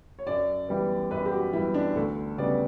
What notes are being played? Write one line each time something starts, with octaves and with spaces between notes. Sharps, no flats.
C#5
F#2 D5
E3 G3 B3
F#2 B4
G4
F#4
E3 G3 B3 E4
D4
D2 A4
C#3 G3 B3 D5